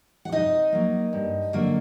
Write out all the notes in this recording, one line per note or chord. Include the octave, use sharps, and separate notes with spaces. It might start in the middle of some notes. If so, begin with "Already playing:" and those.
F#5
C3 D#4 D#5
F#3 A#3
G2
D3 F#3 A#3